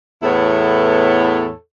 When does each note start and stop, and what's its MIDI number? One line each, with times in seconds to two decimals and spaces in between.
0.22 1.51 40
0.22 1.51 45
0.22 1.51 59
0.22 1.51 64
0.22 1.51 69
0.22 1.51 73